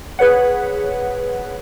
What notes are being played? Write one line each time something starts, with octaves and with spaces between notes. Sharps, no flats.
G#4 B4 C#5 F#5